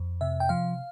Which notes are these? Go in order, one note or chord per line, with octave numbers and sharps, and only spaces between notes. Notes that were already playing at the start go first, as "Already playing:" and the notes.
Already playing: F2
C3 E5
G5
F3 F5